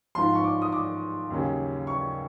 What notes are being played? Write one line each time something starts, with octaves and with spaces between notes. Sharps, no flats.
G#2 F3 C6
C#6
D6
D#6
D6
D#2 C#3 F#3
C#6